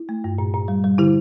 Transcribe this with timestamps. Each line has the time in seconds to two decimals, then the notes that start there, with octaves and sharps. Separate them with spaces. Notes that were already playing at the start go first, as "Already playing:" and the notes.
Already playing: E4
0.09 A3
0.24 G2
0.38 A#2
0.54 A#2
0.68 G3
0.84 G3
0.98 D3 E4 G4